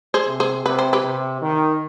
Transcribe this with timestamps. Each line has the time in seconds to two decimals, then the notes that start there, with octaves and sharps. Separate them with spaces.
0.14 G#4 C5
0.27 C3
0.40 G#4 C5
0.65 C3 B4
0.79 C5
0.93 G4 B4
1.03 C3
1.42 D#3